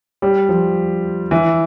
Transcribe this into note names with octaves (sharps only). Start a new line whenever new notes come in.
G3
F3
E3